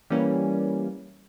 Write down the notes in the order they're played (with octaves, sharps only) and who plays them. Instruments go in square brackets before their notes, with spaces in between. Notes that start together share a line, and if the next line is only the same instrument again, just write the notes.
[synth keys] E3 G3 A#3 C#4